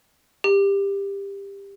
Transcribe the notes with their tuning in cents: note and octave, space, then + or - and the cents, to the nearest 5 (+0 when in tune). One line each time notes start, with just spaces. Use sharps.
G4 +20